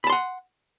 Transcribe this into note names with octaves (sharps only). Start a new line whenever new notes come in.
F#5 A5 B5 C6